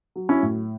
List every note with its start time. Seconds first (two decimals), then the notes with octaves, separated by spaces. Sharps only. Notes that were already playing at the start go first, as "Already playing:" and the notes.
0.16 F#3
0.29 C#4 E4
0.43 A2